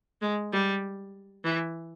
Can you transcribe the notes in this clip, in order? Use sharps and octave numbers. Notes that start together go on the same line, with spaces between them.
G#3
G3
E3